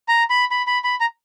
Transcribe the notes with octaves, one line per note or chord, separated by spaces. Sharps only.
A#5
B5
B5
B5
B5
A#5